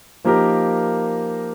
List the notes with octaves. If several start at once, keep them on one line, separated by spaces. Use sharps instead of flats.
F3 A#3 D#4 G4 A#4